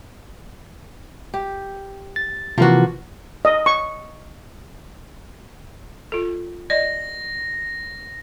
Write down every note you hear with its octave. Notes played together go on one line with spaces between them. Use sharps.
G4
A6
C3 E3 F3 A#3 F#4
D#5
C#6
F4 A4
D5 D#5 A#6